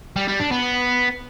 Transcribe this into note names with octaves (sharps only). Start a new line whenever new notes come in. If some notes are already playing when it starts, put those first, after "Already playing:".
G3
G3
D4
B3